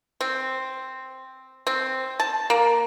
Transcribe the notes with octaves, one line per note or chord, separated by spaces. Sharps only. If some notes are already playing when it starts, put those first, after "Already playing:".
C4
C4
A5
A#3